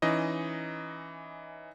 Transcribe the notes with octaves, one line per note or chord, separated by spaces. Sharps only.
E3 C#4 D#4 D#5